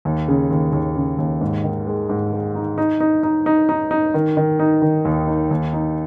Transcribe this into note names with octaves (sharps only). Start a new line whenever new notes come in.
D#2
C#3
D#2
D#2
C#3
D#2
G#2
D#3
G#3
G#2
G#3
D#4
D#4
D#4
D#4
D#4
D#4
D#4
D#3
D#3
D#4
D#3
D#2
D#4
D#2
D#4